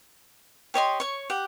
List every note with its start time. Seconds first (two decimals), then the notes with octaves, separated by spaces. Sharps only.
0.74 G4 C#5 D#5 C6
1.00 C#5 C#6
1.30 G4 F#5